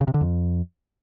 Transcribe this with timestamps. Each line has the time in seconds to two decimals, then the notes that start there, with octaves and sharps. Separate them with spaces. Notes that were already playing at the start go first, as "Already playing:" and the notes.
0.01 C#3
0.08 C3
0.14 D3
0.21 F2